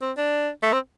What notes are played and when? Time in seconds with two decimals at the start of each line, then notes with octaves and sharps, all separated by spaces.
0.01 C4
0.17 D4
0.62 A3
0.73 C4